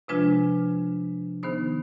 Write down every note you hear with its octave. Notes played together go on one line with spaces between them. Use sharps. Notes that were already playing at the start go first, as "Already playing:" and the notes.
C3 F3 G#3 D4 F4 B4
D#3 B3 D#4 C5